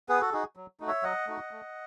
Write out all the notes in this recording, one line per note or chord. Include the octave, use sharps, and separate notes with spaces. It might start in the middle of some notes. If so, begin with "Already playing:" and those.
B3 G#4 B4
F#4 A4
D#4 F#4 G#4
F#3
A3 D#4 F#4
C#5 E5
F#3 D#5 F#5
A3 D#4 F#4
A3